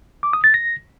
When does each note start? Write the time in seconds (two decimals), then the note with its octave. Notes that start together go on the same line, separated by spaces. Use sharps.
0.23 D6
0.33 D#6
0.44 A6
0.54 A#6